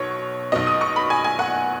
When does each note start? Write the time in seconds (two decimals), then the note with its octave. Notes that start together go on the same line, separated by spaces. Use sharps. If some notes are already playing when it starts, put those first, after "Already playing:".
Already playing: B1 B2 C#5
0.52 B1 B2 D#5
0.67 D#6
0.81 C#6
0.96 B5
1.10 G#5
1.24 G#5
1.39 F#5